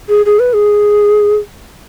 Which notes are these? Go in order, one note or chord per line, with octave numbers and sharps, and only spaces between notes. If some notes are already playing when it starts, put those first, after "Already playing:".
G#4
G#4
B4
G#4